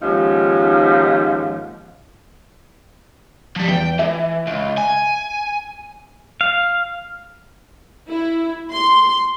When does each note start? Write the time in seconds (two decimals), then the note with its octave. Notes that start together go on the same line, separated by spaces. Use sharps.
0.01 D#2 G#2 F3 C#4 D#4
3.56 F3 G3
3.69 E2 G5
3.99 E3 E5
4.47 C#2
4.78 G#5
6.41 F5
8.09 E4
8.72 C6